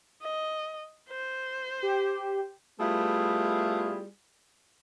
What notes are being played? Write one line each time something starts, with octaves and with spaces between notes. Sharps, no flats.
D#5
C5
G4
G3 A3 B3 E4 F4 G#4